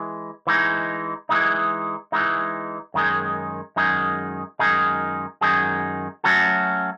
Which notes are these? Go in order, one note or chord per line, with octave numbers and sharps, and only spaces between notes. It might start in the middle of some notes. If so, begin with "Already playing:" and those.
Already playing: E3 G#3
E3 G#3 D#4
E3 G#3 D#4
E3 G#3 D#4
F#2 D#3 G#3 D#4 G#4
F#2 D#3 G#3 D#4 G#4
F#2 D#3 G#3 D#4 G#4
F#2 D#3 G#3 D#4 G#4
F#3 A3 C#4 F#4 A4